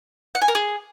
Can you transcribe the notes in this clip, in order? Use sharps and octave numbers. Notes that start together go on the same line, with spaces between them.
F#5
G#5
A#4
G#4